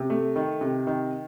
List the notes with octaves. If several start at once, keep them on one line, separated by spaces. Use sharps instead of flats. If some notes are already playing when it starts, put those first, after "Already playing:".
Already playing: C3
A3
D#3
C3
D#3